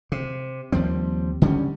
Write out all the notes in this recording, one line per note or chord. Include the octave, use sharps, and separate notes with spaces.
C3
D#2 F3 G3 C4
D3 G3 C#4